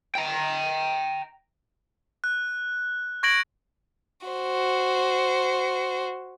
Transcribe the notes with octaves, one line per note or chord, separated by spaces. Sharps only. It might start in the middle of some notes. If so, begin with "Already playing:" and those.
G5 A#5
F#6
C#6 G#6 A#6 D7 F#7
F#4 C5